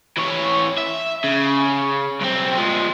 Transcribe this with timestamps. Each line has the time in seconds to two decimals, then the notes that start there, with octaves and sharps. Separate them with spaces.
0.17 E3 C#5
0.78 E5
1.24 C#3
2.21 B1 C4
2.57 F3 G#3